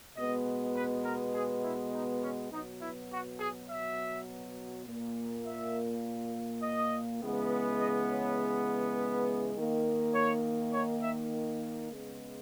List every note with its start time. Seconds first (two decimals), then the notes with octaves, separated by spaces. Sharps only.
0.16 B2 G#3 B3 D#5
0.75 B4
1.04 A#4
1.34 G#4
1.63 E4
1.93 D#4
2.22 C#4
2.51 B2 F#3 B3 D#4
2.81 E4
3.11 F#4
3.39 G#4
3.68 E5
4.86 A#2 A#3
5.45 E5
6.62 D#5
7.21 C#3 E3 G#3 B3
7.79 D#5
8.09 C#5
8.97 B4
9.56 D#3 A#3
10.14 C#5
10.73 C#5
11.03 E5
11.90 C#3 G#3 B3